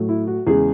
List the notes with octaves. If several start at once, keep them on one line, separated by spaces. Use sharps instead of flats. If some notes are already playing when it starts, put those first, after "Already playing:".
Already playing: A2 F#3 A3
E4
F#4
E2 C#3 G#3 G#4